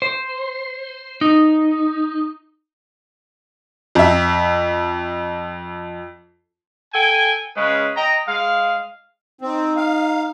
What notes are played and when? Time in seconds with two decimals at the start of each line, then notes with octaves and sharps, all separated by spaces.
0.02 C5
1.21 D#4
3.95 F2 E5
6.93 A4 G5 G#5
7.57 C#3 G#3 C#4 B4
7.97 D#5 G5 A#5
8.28 G#3 F5
9.41 C4 D#4
9.77 F5